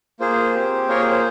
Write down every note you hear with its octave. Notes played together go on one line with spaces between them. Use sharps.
A#3 F4 G#4 C5
C4 G4
A#3 F4 G#4 A#4 C#5
C5
C5